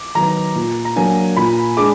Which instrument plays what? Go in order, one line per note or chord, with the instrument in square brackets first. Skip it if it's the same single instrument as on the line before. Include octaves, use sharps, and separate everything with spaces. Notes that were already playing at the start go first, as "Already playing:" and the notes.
Already playing: [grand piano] D6
[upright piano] D#3 F#3 B3 D#4 [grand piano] A#5
[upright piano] A#2
[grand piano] A#5
[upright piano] F#3 A#3 D4 [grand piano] G#5
[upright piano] A#2 [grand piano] B5
[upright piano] G#3 D4 G#4 [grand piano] D6